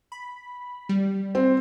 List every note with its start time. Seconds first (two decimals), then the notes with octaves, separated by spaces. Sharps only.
0.12 B5
0.89 G3
1.35 C4